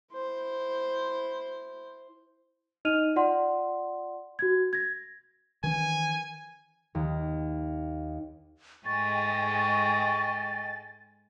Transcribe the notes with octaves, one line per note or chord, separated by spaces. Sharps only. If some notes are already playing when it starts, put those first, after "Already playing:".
E4 C5
D#4 D#5 F6 D#7 F7
F4 D5 F#5 C6
F#4 G#6
G#6 A#6
D#3 E3 C#4 G#5
D#2
G#2 G#3 A3 D#5 G5 G#5 C#6 A6